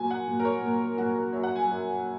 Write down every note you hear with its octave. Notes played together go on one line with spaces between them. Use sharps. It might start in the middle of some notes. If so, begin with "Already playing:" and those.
Already playing: A#2 F#3 G#5
F#5
A#2 F#3
A#4
C#5
A#2 F#3
A#2 F#3 F#4
A#4
F#2 F#3 C#5
F#5
G#5
F#2 F#3